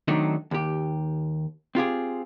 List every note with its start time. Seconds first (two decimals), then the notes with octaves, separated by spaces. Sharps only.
0.08 D#3 F#3 A3 C4 D4 D#4
0.51 D#2 G4
1.75 C4 F4 G4 G#4